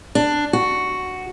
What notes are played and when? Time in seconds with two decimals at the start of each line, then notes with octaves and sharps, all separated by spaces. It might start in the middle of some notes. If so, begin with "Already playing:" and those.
0.15 D4
0.53 F#4